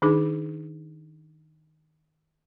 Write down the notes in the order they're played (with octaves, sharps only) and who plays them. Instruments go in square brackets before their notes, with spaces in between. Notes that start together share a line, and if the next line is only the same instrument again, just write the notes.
[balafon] D#3 D4 D#4 G#4 D6